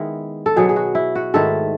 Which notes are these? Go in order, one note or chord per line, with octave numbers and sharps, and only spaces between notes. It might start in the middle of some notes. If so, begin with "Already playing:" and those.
Already playing: D#3 G#3 B3 E4
A4
B2 F#3 B3 G#4
G#4
F#4
E4
F#4
G#2 D#3 A3 E4 A4